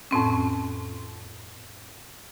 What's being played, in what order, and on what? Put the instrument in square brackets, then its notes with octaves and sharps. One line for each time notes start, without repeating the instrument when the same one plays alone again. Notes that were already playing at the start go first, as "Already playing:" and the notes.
[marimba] F2 A2 C4 C#4